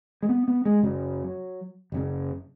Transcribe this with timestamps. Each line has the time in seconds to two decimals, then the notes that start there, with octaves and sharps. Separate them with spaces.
0.23 G#3
0.29 B3
0.48 B3
0.65 G#3
0.83 F#1 F#2 C#3 F#3
1.92 F#1 F#2 C#3